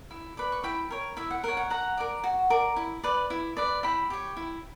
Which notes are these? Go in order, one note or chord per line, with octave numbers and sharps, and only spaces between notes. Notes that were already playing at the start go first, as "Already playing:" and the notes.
E4
B4 D5
C#6
E4 G5 B5
A#4 C#5
E4 E5
F#5
A#4 C#5 F#5
F#5
F#4 F#5 A#5
A#4 D5
F#4
A#4 D5
E4
B4 D5
E4
B4 D5
E4 G5 B5
G4 C#5
E4